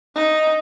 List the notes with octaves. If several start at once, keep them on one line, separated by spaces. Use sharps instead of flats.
D#4